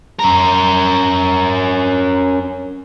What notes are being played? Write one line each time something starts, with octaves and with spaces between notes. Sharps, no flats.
C#4 A#4